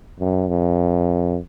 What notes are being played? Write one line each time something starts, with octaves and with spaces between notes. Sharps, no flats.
F#2
F2